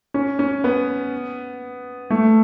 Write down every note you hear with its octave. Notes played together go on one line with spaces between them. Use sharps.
C#4
C#4
B3
A3